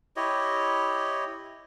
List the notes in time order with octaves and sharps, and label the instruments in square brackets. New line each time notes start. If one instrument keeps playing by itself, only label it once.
[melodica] E4 G4 C#5 D#5